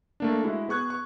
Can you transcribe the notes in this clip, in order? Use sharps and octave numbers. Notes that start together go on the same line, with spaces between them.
A3 A#3 D4
G#3 E4 F#4
B3 G#4 C#6 F#6 G#6
C#6